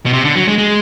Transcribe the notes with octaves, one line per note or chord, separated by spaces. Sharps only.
B2
C3
D3
F#3
G#3
G#3